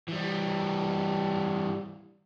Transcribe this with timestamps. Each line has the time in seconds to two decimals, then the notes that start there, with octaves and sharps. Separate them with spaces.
0.08 E3 G3